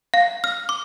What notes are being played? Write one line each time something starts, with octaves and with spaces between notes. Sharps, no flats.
F5
F6
D6